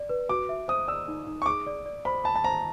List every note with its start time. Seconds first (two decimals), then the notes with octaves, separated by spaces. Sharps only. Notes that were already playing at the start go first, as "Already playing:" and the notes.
Already playing: D5
0.09 B4
0.29 F#4 D6
0.49 E5
0.68 C5 D#6
0.88 D5 E6
1.08 D#4
1.27 D#4
1.42 C#6
1.46 G#4 D6
1.66 D5
1.85 D5
2.05 C5 B5
2.24 A5 B5
2.35 A5
2.44 C5 A#5